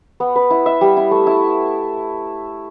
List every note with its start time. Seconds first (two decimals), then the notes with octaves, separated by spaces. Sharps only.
0.20 B3
0.36 B4
0.50 E4
0.66 E5
0.81 G3
0.97 E4
1.11 A3
1.27 E4